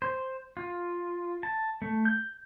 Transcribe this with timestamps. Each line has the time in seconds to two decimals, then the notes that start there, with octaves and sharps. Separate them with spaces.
0.02 C5
0.57 F4
1.43 A5
1.82 A3
2.05 G6